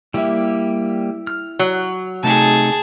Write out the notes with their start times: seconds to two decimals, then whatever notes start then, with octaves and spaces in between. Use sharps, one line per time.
0.14 G3 A#3 E4 G4 E5
1.27 F6
1.59 F#3
2.23 C3 A3 D#4 G#4 A5